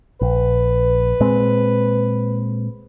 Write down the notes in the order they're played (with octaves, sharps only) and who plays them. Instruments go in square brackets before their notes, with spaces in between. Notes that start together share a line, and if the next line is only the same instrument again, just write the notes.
[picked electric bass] A#1 [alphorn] B4
[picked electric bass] A#2 G#3 C4